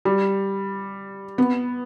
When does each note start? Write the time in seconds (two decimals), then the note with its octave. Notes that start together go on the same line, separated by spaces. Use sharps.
0.05 G3
1.38 B3